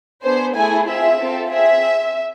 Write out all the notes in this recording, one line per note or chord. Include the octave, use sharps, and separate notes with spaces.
B3 D4 G#4 C5
A3 E4 G#4 G#5
C4 F4 G#4 E5
C4 F4 A4
C4 G#4 E5